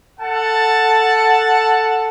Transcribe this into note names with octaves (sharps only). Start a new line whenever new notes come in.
A4 F#5 A5